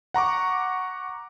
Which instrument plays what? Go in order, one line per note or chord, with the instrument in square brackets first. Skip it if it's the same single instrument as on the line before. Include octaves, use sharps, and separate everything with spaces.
[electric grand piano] F#5 A#5 C#6 D6